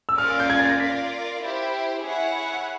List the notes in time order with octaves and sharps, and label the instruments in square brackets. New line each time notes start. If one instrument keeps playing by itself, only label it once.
[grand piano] E6
[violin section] A#3 C#4 F4 A#4 D5 [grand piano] F6
[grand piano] G6
G#6
A6
A#6
[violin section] F4 A#4 D5 [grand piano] B6
[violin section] E4 G4 C5
E4 G#4 C#5 F#5